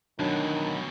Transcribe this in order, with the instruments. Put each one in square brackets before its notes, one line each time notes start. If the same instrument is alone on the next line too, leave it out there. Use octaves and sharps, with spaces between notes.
[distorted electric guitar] D2 B2 [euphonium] D#3 [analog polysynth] F#3 [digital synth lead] D4